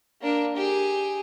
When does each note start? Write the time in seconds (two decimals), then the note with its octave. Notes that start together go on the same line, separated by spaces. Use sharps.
0.21 A#3 D4
0.57 G4 G#4